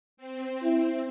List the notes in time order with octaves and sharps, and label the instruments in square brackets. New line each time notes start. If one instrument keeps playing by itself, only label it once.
[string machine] C4
[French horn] E4